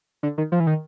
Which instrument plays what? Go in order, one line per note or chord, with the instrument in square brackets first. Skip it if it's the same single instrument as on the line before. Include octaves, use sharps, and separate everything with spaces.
[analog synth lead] D3
D#3
F3
E3
D#3